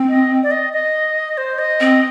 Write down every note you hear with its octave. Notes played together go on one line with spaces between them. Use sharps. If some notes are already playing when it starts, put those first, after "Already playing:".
Already playing: C4
D#5
D5
D#5
D#5
C5
D#5
C4